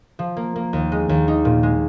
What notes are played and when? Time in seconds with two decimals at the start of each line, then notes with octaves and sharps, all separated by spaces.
0.19 F3
0.37 A#3
0.56 A#3
0.73 D#2
0.92 G#3
1.09 D#2
1.28 D#4
1.45 A#2
1.63 G#3